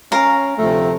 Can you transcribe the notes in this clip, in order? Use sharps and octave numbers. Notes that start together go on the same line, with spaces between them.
C#4 A#4 F5
D2 C3 F3 A3